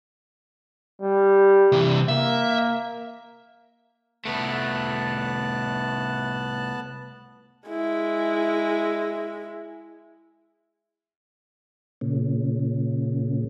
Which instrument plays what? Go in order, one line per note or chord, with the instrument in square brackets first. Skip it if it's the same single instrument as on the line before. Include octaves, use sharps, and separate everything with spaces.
[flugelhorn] G3
[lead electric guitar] C3 E3
[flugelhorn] A#3 [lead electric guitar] E5
[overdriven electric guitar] C2 A3 [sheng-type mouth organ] B3 A5 F#6
[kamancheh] G#3 E4
[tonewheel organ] A#2 C#3